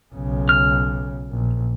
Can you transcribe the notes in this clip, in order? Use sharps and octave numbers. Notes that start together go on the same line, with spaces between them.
B1 C#3
F6
A#1